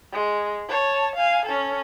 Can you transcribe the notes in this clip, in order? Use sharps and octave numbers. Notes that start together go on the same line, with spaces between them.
G#3
C#5 A5
F5 G#5
C#4 A4